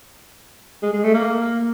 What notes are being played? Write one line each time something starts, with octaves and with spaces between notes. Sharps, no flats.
G#3
G#3
A3
A#3